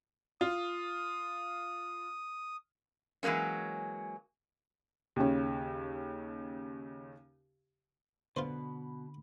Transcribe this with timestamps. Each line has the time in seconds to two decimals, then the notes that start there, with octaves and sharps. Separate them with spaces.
0.41 F4 D#6
3.23 E3 F#3 G#3 A#3 C#4
5.16 D#2 C#3 C#4
8.36 B2 D3 F4 B4 C5 B5